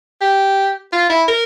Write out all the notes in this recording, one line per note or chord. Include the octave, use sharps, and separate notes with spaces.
G4
F4
E4
A#4